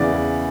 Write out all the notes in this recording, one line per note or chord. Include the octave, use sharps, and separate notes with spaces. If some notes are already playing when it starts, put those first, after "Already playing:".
Already playing: E2 C#3 E3 D5
E2